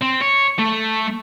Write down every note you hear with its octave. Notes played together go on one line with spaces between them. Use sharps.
C4
C#5
A3